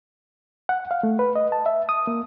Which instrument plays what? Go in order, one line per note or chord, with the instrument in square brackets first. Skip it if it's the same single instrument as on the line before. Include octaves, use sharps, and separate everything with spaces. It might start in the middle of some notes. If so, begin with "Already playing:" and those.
[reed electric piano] F#5
F5
A3
B4
D#5
A5
E5
D#6
A#3